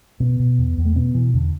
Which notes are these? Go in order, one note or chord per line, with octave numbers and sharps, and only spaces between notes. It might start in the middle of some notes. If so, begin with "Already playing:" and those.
B2 B3
B2
E2
E2
A3
B2 B3
B2 E3
E2 D3